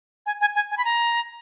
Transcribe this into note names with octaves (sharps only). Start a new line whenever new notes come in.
G#5
G#5
G#5
G#5
B5
A#5